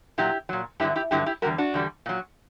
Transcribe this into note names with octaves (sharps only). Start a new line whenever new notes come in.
A#2 F#3 E4 G4
A#2 F#3
G2 D3 F#3 E4 G4
E4 G4
G2 D3 F#3 E4 G4
E4 G4
E2 D3 G3 F#4 A#4
D4 F#4
E2 D3 G3
A#2 F#3